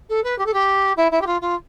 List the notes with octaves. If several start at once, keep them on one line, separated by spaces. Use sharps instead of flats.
A4
B4
G4
A4
G4
E4
E4
G4
F4
F4